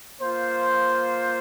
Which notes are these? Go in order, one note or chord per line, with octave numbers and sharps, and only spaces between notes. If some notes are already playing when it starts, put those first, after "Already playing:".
A#3 F4 C5